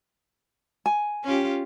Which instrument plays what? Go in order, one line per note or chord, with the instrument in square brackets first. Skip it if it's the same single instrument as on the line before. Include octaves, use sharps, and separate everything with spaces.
[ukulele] G#5
[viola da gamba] C#4 F4 G4